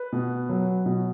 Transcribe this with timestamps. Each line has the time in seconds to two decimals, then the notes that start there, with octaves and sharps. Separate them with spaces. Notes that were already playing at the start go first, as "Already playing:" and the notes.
Already playing: B4
0.12 B2
0.49 F#3
0.86 B2